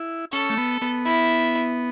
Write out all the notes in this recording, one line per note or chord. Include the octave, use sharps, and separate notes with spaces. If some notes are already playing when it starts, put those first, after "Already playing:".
Already playing: E4
C#4 A4
A3
B3
B3
E4